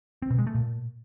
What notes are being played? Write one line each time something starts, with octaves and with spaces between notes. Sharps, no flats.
C4
B2
G#3
A3
A#2